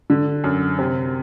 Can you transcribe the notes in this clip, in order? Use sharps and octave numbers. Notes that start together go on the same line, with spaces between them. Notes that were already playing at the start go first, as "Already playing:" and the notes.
D3
F#2
C3